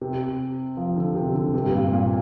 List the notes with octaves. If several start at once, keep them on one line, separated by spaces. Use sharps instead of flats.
C3
F3
D3
C3
D3
C3
G2
A#2
A#2